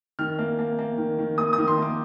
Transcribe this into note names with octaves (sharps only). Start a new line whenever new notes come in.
D#3 F6
A#3
A#3
A#3
D#3
D#3
A#3 D#6
D#6
D#3
C6
A#3 D6